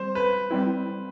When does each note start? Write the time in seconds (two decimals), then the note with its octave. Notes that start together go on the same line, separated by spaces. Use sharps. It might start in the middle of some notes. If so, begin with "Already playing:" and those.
Already playing: G3 C4 C5
0.15 B4
0.51 G3 C4 E4